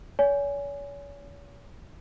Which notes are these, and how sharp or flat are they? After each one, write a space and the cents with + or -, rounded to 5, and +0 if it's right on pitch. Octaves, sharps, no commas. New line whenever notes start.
C#5 +40 G#5 +0